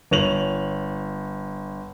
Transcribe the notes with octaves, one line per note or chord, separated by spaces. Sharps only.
G1 C#5 F7 F#7